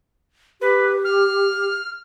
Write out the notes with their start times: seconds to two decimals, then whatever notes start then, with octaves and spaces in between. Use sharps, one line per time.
0.61 G4 B4
1.05 F6